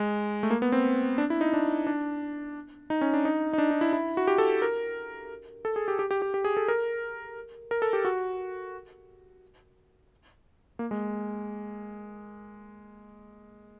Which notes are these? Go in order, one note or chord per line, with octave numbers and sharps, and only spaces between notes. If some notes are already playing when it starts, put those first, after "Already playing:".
Already playing: G#3
A3
A#3
B3
C4
D4
E4
D#4
D4
D4
D#4
C#4
D4
D#4
D#4
D4
D#4
E4
E4
F#4
G4
A4
A#4
A4
G#4
G4
G4
G4
G4
G4
G#4
A4
A#4
A#4
A4
G4
F#4
A#3
G#3